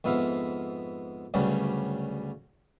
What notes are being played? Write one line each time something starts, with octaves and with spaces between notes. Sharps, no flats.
F2 G#2 B3 E5 F5
D2 G2 C#3 F#3 G3